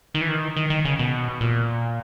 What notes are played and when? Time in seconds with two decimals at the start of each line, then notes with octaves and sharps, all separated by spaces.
0.14 D#3
0.21 E3
0.29 D#3
0.56 D#3
0.70 D#3
0.85 C#3
0.99 B2
1.41 A#2